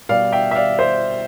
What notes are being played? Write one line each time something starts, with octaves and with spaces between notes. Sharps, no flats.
B2 G3 D5 F5
E5 G5
E5
D5 F5
C5 E5